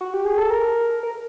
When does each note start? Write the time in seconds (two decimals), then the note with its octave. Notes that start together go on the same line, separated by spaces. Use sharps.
0.01 F#4
0.14 G4
0.25 G#4
0.38 A4
0.50 A#4
1.03 A#4